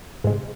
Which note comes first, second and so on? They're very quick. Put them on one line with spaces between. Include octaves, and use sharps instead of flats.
G#2 G#3 C3